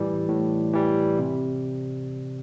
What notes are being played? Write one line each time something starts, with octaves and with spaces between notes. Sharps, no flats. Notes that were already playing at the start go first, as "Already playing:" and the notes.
Already playing: A2 E3 G3 D5
A2
E3 G3
C3